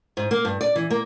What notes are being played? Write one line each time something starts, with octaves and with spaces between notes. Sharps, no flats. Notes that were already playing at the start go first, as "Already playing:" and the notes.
G#2
A#3
G2
D5
E3
A#3